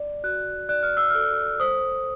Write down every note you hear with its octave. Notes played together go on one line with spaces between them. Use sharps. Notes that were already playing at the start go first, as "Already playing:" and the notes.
Already playing: D5
F#4 F#6
D5 F#6
F6
E6
A4 F6
C5 D#6